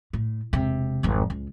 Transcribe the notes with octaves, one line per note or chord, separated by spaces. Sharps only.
A2
E1 C3
G#1 F2
C#2